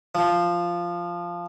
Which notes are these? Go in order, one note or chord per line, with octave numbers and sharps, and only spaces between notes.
F3